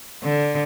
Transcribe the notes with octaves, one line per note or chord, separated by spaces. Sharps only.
D3